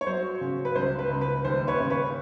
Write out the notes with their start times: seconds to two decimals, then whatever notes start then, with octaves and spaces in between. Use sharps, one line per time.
0.01 C#5
0.07 F#3 C5
0.41 C#3
0.65 B4
0.75 C#2 C5
0.99 B4
1.10 C#2
1.21 B4
1.45 D#2 C5
1.67 B4 C#5
1.79 C#3
1.90 B4 C#5